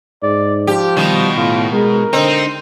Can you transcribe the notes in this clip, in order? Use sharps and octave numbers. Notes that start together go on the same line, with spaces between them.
G#2 D5
F3 G4
B2 D#3 G3
A2 F4
G#3 A#4
D3 C4 D#4